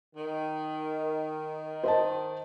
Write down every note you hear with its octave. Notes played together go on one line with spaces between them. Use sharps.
D#3
C5 D#5 A5